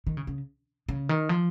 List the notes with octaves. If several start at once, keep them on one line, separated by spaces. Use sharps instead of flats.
D#3
C#3
C#3
C#3
D#3
F3